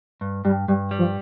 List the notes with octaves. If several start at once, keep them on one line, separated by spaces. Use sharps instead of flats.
G2
G2 G3
G2 G3
G3
F3